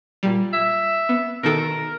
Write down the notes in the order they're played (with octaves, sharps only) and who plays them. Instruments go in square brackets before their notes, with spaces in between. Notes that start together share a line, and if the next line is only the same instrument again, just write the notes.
[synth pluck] A#2 G3
[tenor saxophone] E5
[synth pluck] B3
[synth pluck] B2 D#3 A4 [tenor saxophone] A#4